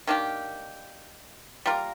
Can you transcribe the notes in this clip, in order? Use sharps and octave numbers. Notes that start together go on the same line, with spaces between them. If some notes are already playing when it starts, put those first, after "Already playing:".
D#3 A#3 D4 G4
G3 A#3 F4 A#4